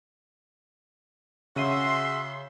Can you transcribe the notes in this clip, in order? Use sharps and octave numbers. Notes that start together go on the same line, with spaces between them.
C#3 F#4 G#4 E5 C6 D#7